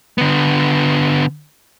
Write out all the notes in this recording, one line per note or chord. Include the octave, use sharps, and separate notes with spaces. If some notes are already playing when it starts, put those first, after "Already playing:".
D3 B3